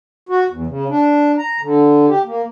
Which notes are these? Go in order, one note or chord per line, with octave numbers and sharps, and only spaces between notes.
F#4
E2
C#3
D4
A#5
D3
G4
A#3